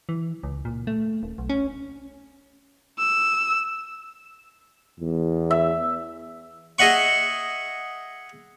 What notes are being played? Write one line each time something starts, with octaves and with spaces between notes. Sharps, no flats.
E3
C#2
A#2
A3
D#1
B1
C#4
E6
E2
E5
G#4 D#5 E5 F#5 C#6